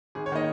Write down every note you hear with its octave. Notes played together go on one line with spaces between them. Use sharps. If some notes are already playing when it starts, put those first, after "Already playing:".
G#1 G#4
C#5
D#3 A#3 D#5